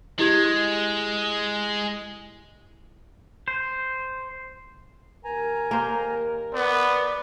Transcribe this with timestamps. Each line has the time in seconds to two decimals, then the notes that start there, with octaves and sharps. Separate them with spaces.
0.19 G#3 E4 G4 G#6
3.48 C5
5.25 D#2 A#4 G#5 A#5
5.71 A#3 G4 C5
6.53 B3 D5